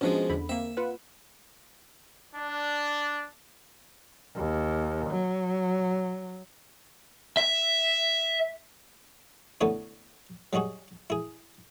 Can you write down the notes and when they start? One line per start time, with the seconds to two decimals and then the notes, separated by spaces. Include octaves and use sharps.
0.01 B2 F3 G#3 C#4 D4
0.29 E2 D3 B5
0.49 A#3 C4 E5
0.77 F4 B4 F#5
2.35 D4
4.36 D#2
5.10 F#3
7.37 E5
9.61 D3 A3 B3 D4 E4 C#5
10.53 F#3 G3 D#4 F#4 G#4
11.10 E4 G#4